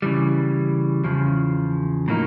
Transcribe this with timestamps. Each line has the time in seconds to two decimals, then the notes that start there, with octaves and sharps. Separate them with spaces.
0.02 C#3 E3 G3
1.04 E2 C#3 F3
2.08 A2 F#3 A#3 D#4